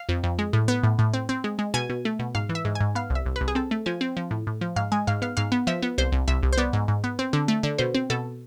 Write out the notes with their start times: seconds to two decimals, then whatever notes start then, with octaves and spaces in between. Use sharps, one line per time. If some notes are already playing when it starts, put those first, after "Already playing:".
Already playing: F5
0.09 F2
0.24 F2
0.39 G#3
0.53 A2
0.68 B3
0.83 A2
0.99 A2
1.14 C4
1.29 C4
1.44 G#3
1.59 G#3
1.74 B2 G#5
1.90 B2
2.05 A3
2.19 B2
2.35 G#2 F5
2.49 E3
2.55 E5
2.65 G#2
2.75 G#5
2.81 G#2
2.95 B3 F5
3.10 C2
3.15 E5
3.26 C2
3.36 B4
3.41 C2
3.48 G#4
3.55 C4 A4
3.71 A3
3.86 F3 G#5
4.01 C4
4.17 F3
4.31 A2
4.47 A2
4.61 F3
4.76 G#2 F5
4.92 G#3 G#5
5.07 G#2 F5
5.22 B3 F5
5.37 G#2 F5
5.52 B3
5.67 F3 E5
5.83 B3
5.98 C2 C5
6.12 C2
6.28 C2 E5
6.43 C2
6.53 C5
6.58 B3 D5
6.73 G#2
6.88 G#2
7.04 B3
7.19 C4
7.33 D3
7.48 A3
7.63 D3
7.79 B2 C5
7.95 C4
8.10 B2 A4